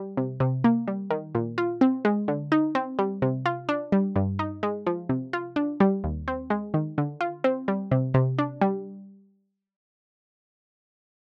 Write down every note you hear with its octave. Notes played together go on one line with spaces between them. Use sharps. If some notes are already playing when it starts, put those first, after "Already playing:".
Already playing: G3
C3
C3
A#3
G3
D#3
A#2
F4
C4
G#3
D3
D#4
C4
G3
C3
F4
D4
G3
G2
D#4
G#3
F3
C3
F4
D4
G3
D#2
C4
G#3
D#3
D3
F4
C4
G3
C3
C3
D4
G3